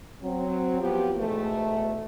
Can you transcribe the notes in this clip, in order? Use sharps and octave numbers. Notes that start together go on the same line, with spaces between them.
F#3 C4
F3 B3 G4
E2 G#2 B2 A3